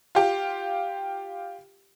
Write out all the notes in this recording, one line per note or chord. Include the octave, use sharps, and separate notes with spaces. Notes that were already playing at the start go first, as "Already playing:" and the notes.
F4 G4